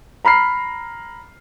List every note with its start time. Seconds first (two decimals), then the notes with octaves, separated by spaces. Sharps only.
0.25 A#5 B5 F6 C7